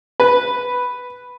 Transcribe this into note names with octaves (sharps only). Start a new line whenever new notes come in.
B4